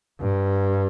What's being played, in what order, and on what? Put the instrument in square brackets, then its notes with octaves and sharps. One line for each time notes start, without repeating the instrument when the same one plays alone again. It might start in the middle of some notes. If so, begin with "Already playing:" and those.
[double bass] G2